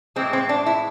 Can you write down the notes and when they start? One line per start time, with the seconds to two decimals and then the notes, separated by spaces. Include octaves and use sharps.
0.16 A2 E3 G#3 C4
0.33 C4
0.49 D4
0.66 E4